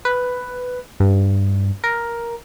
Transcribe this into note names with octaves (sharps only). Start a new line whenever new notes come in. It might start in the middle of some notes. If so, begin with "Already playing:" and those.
B4
G2
A#4